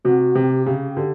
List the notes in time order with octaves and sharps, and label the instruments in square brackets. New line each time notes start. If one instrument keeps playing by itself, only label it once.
[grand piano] C3 [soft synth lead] F#4
[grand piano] C3 [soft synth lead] G4
[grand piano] C#3 [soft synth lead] G4
[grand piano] D3